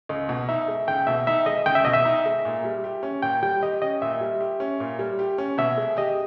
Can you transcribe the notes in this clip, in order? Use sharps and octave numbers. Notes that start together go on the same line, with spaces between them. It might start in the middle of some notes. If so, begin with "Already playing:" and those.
C#2 D#5
B2
D#4 E5
G#3
C#2 G5
B2 E5
D#4 E5
G#3 D#5
C#2 G5
E5
B2 D#5
E5
D#4
G#3
A#2
G3
G4
C#4
A#2 G5
G3 G5
G4 D#5
C#4 D#5
A#2 E5
G3
G4
C#4
A#2
G3
G4
C#4
B2 E5
G#3
G4 D#5